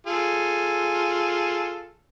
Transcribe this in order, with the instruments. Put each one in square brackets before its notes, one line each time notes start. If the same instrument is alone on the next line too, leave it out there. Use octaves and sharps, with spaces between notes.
[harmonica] F4 G#4 A4